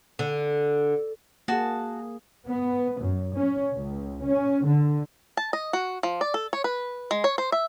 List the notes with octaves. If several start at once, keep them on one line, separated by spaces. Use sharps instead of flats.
D3
A#3 F#4 G#4 A5
B3
F#2
C#4
C#2
C#4
D3
A5
D#5
F#4
F3
D5
A4
C#5
B4
G#3
C#5
C5
E5